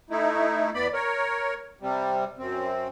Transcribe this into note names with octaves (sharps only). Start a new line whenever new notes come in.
A3 D#4 E4
E2 B3 D5 B5
A#4 C#5
C3 G3
F#2 C4